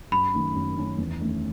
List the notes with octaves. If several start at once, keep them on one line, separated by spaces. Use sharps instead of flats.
F#2 B5
D#3 A3 C#4
F#2
D#3 A3 C#4
E2
D#3 A3 C#4